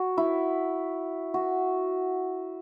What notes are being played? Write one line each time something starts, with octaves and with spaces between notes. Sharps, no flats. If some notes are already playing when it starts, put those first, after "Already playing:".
Already playing: F#4
E4
F#4